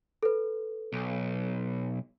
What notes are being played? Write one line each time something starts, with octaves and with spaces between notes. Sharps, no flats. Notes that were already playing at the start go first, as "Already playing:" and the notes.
A4 B4
B1